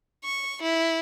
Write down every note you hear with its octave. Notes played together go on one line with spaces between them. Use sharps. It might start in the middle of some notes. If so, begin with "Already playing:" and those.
C#6
E4